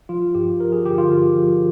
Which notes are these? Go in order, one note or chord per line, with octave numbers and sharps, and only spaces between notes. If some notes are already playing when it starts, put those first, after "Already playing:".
F3 F4
G2 G4
F3 A#4
G#4
D3 G4
F4
G2
F3